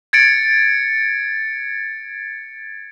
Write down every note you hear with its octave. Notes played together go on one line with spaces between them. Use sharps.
G#6 A6 C#7 D7